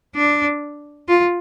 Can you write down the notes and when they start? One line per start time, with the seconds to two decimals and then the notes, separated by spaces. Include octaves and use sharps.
0.16 D4
1.08 F4